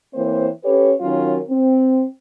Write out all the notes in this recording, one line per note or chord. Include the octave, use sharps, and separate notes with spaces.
E3 A#3 C4 C5 C#5
C#4 G4 A4 B4 C#5
D#3 F#3 C#4 F4 A#4
C4